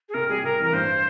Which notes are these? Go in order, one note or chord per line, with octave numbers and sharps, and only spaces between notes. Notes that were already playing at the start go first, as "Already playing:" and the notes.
G#4
C3 A#4
G3 G#4
C3 A#4
E3 A#4
G2 C5